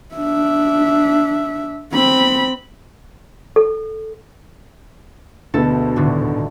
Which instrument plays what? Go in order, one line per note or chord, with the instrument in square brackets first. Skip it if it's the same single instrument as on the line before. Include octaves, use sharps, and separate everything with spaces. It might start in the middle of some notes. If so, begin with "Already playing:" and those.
[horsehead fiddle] D4 E5
C4 B5
[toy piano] A4
[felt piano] D2 B2 B3 [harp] A4
[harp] D#1 A2 D3